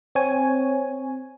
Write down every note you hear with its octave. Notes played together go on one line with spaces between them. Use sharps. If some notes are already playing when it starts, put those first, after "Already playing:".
C4 C#5 G#5